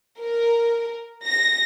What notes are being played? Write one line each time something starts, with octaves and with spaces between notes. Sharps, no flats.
A#4
A#6